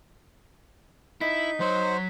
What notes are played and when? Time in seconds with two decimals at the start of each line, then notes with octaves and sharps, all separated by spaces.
1.21 D#4 E4 B6
1.60 F#3 C5 C#5